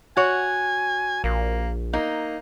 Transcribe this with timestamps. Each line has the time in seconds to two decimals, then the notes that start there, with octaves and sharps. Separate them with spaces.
0.17 F#4 C#5 G#5
1.24 A#1 A#3
1.93 A#3 D#4